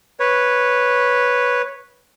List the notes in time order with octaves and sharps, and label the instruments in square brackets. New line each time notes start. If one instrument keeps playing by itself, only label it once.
[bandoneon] B4 C#5